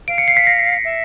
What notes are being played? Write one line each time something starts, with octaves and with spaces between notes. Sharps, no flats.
F5 D7
C#7
C7
B6
A#6
E5